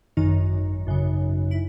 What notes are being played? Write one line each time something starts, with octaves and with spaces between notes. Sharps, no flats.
G#1 F#2 D#3 D#4
G#1 F#2 C#3
E4